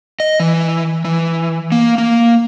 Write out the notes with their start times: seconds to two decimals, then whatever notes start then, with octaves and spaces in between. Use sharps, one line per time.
0.20 D#5
0.40 E3
1.05 E3
1.72 A#3
1.98 A#3